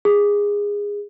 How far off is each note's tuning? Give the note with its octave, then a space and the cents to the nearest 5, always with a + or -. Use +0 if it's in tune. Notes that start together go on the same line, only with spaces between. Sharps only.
G#4 -20